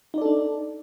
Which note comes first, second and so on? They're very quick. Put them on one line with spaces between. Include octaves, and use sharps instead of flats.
D#4 D5 A4 D4